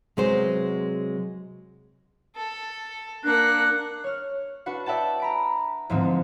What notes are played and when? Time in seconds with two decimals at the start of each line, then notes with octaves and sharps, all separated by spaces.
0.17 C3 F#3 G#3 B3 C5
2.36 A4
3.24 A#3 D4 F#5 F#6
4.04 C#5 F6
4.66 D4 F#4 B4 F#5
4.86 D5 E5 F#5 G5 A5
5.20 A#5 B5 D7
5.90 D2 G#2 E3 F3 C4